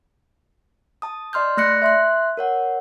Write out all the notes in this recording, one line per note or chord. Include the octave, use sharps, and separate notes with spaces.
A5 D#6
D5 D#5 C6 F6 G6
A3 D5 F#6 A#6 C#7
E5 C6 F#6
A#4 C#5 F#5